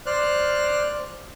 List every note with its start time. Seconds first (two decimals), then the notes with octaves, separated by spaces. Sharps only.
0.06 C5 D5 F6 F#6